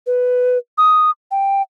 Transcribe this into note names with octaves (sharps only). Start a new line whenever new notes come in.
B4
D#6
G5